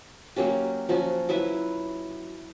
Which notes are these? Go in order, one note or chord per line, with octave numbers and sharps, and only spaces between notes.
F#3 A#3 C#4 G4
F3 F#3 C#4 F#4
F#3 E4 B4 E5